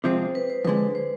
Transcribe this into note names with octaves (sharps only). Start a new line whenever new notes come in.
C3 F3 G#3 C4 C5
B4
C5
F2 D3 G#3 B4
C5